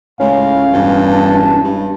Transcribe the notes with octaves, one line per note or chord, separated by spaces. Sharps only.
C#2 A2 C#4 F5
E1 G2
A5
G2